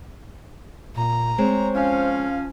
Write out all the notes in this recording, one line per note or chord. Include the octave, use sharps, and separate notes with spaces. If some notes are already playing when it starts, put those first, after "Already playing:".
A#2 A#5
G#3 C4 C5 C#5
F3 C#4 F5